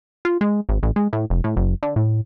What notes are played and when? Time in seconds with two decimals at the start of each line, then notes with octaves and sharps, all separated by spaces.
0.25 F4
0.41 G#3
0.69 G#1
0.83 A1
0.96 G#3
1.13 A2
1.30 F1
1.44 A2
1.56 F#1
1.83 D3
1.96 A2